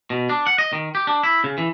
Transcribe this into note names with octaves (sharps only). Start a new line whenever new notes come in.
B2
D4
F#5
D#5
D#3
G4
D4
E4
C#3
E3